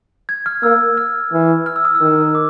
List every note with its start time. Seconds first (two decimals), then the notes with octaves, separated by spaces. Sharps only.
0.29 G#6
0.46 F6
0.63 A#3 E6
0.97 F6
1.32 E3
1.66 F6
1.76 E6
1.85 D#6
1.95 E6
2.00 D#3
2.35 D6